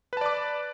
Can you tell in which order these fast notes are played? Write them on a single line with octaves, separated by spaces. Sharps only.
B4 A5 D5 D6